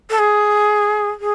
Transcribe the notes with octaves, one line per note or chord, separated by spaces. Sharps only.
A4
G#4
G#4